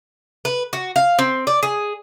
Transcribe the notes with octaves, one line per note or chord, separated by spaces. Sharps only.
B4
F#4
F5
C4
D5
G#4